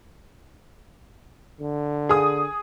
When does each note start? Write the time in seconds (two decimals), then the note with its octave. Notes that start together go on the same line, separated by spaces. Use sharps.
1.61 D3
2.09 G#4 D#6